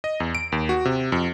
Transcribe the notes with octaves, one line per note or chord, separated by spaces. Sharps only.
D#5
E2
D7
D#2
F#4
C3
F2